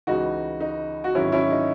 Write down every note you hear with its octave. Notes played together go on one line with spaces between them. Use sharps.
C#2 C#3 E3 D#4 F#4
D#4
F#4
G#1 G#2 D#3 F#3 C#4 E4
C#4 E4
D#4